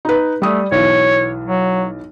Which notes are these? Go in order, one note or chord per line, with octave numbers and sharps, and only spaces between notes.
D#4 B4
G3 A3 D#6
B1 E3 C#5
F#3